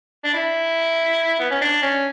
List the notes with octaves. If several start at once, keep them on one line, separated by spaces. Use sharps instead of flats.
D4
E4
B3
C#4
D4
C#4